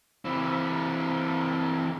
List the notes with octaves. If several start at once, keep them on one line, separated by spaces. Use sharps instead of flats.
E3 C4